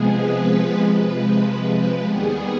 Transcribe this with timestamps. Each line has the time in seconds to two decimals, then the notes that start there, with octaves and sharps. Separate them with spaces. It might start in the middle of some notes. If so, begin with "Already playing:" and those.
Already playing: C3 F3 G#3 B3 G#4
0.16 B4
0.79 C3 F3 G#3
2.05 D#2 D#3 G3 B3 G#4